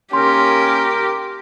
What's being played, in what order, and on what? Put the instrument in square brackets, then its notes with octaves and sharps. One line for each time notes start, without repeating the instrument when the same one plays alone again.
[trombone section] D#3 A#3 C#4 [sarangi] G4 [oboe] A#4 [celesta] C6